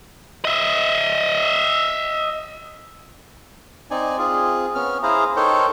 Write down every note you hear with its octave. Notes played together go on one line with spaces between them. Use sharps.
D#5 E5
C4 D#4 D5 G#5
C4 F4 G#4
B3 C#4 F6
E4 G#4 C5 F5 A#5
D#4 A4 A#4 C5 C#5 G5